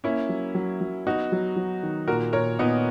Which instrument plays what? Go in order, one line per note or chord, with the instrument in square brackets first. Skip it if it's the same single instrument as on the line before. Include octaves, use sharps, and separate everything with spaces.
[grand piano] A#3 [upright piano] C#4 E4
[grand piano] F#3
F#3
F#3
[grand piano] B3 [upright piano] D#4 F#4
[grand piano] F#3
F#3
D#3
[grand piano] A#2 [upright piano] F#4 A#4
[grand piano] A#2 [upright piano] A#4 C#5
[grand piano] A#2 [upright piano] B3 D#4